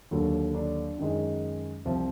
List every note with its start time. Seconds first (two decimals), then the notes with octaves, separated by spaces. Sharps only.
0.11 D#2 D3 F#3
0.55 D4
0.98 F#2 D#3 G#3
1.85 C2 C3 F3